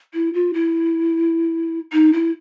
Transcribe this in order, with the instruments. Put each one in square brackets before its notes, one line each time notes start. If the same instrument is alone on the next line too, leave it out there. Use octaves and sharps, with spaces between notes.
[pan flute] E4
F4
E4
D#4
E4